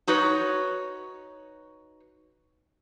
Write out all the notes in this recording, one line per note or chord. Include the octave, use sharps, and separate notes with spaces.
D#4 F#4 B4 C#5